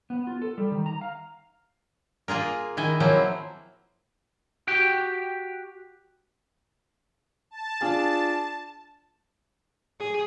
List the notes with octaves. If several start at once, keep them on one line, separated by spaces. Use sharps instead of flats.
B3
F4
A4
G3
D#3
A#5
F5
A#3 F4 G#4 A#4
D#3 E4 D#5 G#5
F3 F#3 A#3 C4 E4
F#4 G4 G5
A5
D4 F4 G#4
G#4